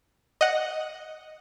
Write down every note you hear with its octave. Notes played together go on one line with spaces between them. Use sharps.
D#5 F#5